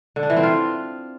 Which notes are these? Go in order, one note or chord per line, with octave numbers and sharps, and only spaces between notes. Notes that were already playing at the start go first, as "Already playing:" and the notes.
D3
D4
E3
C4
F4